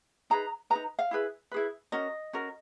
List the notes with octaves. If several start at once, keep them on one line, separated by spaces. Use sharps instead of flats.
D#4 G#4 B4 A#5
G#4 B4 A#5
D#4
F5
E4 G#4 B4
E4 G#4 B4
C#4 F#4 A#4 D#5
C#4 F#4 A#4